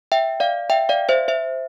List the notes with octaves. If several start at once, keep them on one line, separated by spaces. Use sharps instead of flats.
E5 G5
D5 F5
E5 G5
D5 F5
C5 E5
C5 E5